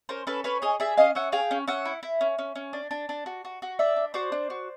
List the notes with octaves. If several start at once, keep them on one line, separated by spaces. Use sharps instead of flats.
C#4 A#4 C5
C#4 A4 B4
C#4 B4 C#5
G#4 C#5 D#5
G#4 D5 E5
C#4 D#5 F5
C#4 E5 F#5
G#4 F5 G5
C#4
C#4 E5 F#5
E4
E4
C#4
C#4
C#4
D4
D4
D4
F#4
F#4
F#4
D4 D5 E5
D4
F#4 C5 D5
D4
F#4